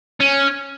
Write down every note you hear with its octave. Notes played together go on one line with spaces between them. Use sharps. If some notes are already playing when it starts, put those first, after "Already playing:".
C#4